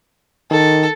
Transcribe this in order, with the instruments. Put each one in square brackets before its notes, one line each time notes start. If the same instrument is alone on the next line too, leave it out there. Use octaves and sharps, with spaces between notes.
[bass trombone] D#3 [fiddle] A4